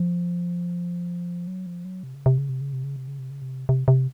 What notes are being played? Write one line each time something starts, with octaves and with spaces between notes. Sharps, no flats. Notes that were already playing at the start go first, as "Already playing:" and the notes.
Already playing: F3
F#3
F3
F#3
C3
C#3
C3
C#3
C3
C#3
C3
C#3
C3
C#3
C3
C#3
C3
C3
C3